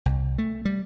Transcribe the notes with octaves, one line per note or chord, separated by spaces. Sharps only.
C2
A3
G3